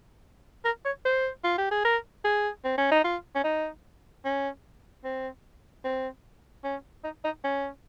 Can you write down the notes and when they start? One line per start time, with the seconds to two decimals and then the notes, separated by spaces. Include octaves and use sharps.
0.65 A#4
0.85 C#5
1.05 C5
1.44 F4
1.58 G4
1.71 G#4
1.85 A#4
2.25 G#4
2.64 C4
2.78 C#4
2.91 D#4
3.04 F4
3.35 C#4
3.44 D#4
4.25 C#4
5.04 C4
5.84 C4
6.64 C#4
7.04 D#4
7.24 D#4
7.44 C#4